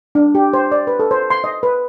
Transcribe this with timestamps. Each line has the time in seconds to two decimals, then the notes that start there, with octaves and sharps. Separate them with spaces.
0.15 D4
0.35 G4
0.53 C5
0.72 D5
0.87 B4
1.00 A4
1.11 C5
1.30 C6
1.44 D#5
1.63 B4